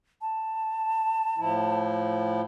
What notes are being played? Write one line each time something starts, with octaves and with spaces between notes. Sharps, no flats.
A5
A2 F3 E4